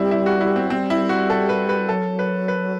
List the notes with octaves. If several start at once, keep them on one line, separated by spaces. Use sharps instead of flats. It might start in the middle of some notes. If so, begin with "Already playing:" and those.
Already playing: G3 C4 E4
E4
F#4
E4
C4
G3 C4
E4
F#4
A4
B4
B4
F#3 A4
B4
B4